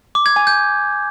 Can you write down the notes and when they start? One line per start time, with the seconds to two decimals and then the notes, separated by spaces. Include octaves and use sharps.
0.15 D6
0.26 G#6
0.36 G#5
0.47 G6